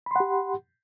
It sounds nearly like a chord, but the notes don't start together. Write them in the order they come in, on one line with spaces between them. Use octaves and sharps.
B5 C6 F#5 G4